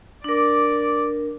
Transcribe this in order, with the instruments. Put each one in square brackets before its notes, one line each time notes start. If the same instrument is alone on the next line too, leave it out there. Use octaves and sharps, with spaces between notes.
[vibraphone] D4 A#4 [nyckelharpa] D5 D6